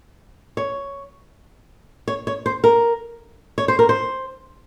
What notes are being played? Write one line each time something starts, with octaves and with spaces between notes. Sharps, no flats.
C#5
C#5
C#5
C5
A#4
C#5
C5
A#4
C5